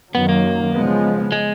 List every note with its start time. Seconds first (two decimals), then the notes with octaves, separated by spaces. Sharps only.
0.14 F#2 D#3 F#3 B3
0.29 A#3
0.73 C#3 F3 G#3 B3
1.32 G#3